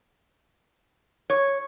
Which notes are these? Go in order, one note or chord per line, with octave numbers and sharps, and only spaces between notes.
C#5